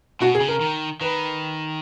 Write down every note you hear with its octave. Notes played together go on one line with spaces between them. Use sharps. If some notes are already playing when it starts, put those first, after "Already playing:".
B2 F#4
G#4
C#3
A#4
D#3
D#3 B4